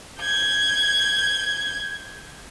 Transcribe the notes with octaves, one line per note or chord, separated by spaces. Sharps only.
G6 G#6